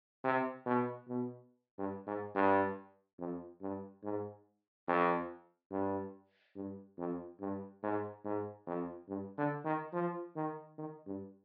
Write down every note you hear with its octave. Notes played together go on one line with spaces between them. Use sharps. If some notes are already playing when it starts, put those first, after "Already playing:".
C3
B2
B2
G2
G#2
G2
F2
G2
G#2
F2
G2
G2
F2
G2
G#2
G#2
F2
G2
D3
D#3
F3
D#3
D#3
G2